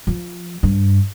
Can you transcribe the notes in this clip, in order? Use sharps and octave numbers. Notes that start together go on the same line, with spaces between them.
F3
G2